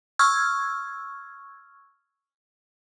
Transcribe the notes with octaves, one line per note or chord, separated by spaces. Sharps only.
C#6 E6 F6 G#6